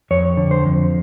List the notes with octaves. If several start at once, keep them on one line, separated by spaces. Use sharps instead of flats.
F2 C#5
D3
C5
F2